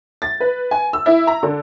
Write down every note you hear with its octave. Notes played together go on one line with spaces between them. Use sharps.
A6
B4
G#5
E6
E4
A#5
D3